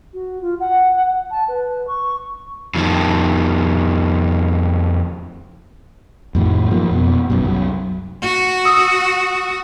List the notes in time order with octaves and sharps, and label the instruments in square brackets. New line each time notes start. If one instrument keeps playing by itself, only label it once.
[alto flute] F#4
F4
F#5
A5
B4
C#6
[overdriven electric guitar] F2 D#3
[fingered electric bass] F2 A2 D#3
F#2 F3 A#3
F2 B2
F#2 B2
C2 F#2 F#3
[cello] F#4
[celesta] D#6 E6 C#7